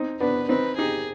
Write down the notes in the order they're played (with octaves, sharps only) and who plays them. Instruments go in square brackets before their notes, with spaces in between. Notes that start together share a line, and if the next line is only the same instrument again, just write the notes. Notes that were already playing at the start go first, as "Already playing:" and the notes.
Already playing: [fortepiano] C4 D#4
[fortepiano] B3 D4 [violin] B4
[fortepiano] C4 D#4 [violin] B4
[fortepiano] D#4 G4 [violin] G#4